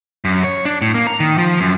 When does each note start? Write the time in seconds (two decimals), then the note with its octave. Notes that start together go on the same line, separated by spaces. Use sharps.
0.25 F#2
0.44 C#5
0.65 D4
0.81 A2
0.94 A#3
1.07 A#5
1.20 D#3
1.38 F3
1.60 F#2